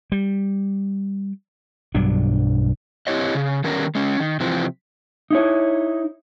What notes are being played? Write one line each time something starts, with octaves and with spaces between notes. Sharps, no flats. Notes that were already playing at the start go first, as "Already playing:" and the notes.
G3
B1 G2 F#3 D4
C4 E4 G4 C#5 D#5
C#3
D3 D#3 G3 B3 C#4 A#4
G#3 C#4
D#3
C3 E3 F3 C4
D#4 E4 C#5